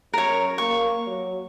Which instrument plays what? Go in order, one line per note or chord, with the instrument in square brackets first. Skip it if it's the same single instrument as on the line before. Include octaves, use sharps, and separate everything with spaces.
[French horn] F#2 [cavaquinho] A#4 C#5
[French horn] A#3 [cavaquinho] C#6
[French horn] F#3